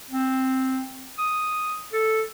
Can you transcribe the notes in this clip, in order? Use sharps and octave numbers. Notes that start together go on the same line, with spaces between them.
C4
D#6
A4